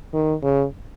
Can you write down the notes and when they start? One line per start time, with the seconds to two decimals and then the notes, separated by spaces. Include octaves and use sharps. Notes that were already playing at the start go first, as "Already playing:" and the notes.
0.14 D#3
0.43 C#3